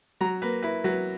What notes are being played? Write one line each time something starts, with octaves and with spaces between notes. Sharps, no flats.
F#3 A#5
A#3 B4
E4 B4
F#3 B4